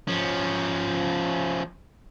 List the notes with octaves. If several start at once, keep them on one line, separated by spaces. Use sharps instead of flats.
F3 C#4